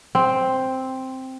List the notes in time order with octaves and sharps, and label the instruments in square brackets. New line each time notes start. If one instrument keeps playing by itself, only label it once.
[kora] C4